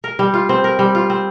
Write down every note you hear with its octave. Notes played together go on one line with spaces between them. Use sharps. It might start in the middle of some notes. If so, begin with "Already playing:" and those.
A#4
G3
F4
C4
A#4
G3
F4
C4